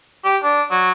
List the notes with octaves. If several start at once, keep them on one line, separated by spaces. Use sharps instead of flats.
G4
D4
F#3